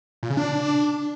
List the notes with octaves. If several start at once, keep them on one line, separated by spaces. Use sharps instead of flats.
A#2
C#3
D4